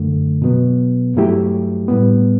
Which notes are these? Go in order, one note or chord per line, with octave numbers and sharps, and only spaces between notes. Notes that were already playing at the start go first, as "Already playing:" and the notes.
Already playing: F#2 D3 A3
B2 F#3 B3
G2 F#3 A3 E4 G4
A2 G3 B3